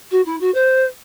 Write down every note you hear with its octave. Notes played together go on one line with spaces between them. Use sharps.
F#4
E4
F#4
C5